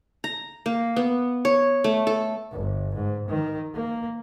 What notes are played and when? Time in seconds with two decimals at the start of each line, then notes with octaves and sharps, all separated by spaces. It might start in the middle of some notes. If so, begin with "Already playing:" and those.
0.24 A#5
0.66 A#3
0.96 B3
1.45 C#5
1.84 A3
2.07 A4
2.52 G1
2.95 G#2
3.28 D#3
3.74 A#3